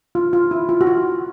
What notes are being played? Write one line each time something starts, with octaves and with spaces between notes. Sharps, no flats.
F4
F4
E4
F4
F#4
F4